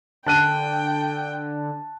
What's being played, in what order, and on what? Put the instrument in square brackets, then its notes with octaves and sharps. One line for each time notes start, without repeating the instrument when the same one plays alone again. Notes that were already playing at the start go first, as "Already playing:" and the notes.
[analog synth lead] D3 [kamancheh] G5 [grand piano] A5 F#6 D#7